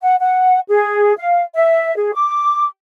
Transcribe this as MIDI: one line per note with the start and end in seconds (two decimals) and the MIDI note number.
0.02 0.15 78
0.21 0.60 78
0.68 1.13 68
1.17 1.41 77
1.55 1.95 76
1.95 2.12 68
2.14 2.65 86